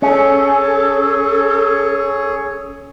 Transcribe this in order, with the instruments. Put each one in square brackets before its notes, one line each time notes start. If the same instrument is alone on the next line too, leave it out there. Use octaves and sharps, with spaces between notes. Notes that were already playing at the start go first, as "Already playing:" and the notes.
[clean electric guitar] C#4 [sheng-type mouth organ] G#4 C#5 [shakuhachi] A4